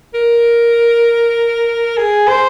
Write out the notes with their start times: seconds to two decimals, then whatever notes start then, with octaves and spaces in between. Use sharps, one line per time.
0.14 A#4
1.97 G#4
2.28 C5